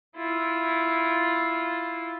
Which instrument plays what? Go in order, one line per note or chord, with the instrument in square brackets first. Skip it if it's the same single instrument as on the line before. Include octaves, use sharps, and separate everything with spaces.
[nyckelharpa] E4 F4